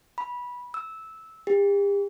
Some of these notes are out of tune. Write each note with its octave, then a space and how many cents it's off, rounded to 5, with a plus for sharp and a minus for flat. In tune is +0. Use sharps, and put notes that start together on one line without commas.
B5 -15
E6 -15
G4 +40